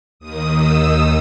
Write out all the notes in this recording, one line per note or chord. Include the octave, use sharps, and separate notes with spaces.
D#2 D#3 D#6
E6